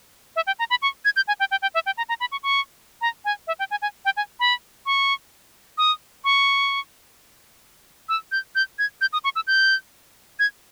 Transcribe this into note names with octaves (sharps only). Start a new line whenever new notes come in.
E5
G5
A#5
B5
C#6
G#6
G6
G#5
G5
G5
G5
E5
G5
A#5
A#5
B5
C#6
C#6
A#5
G#5
E5
G5
G#5
G#5
G5
G#5
B5
C#6
D#6
C#6
E6
G6
G6
G#6
G6
D#6
C#6
E6
G6
G#6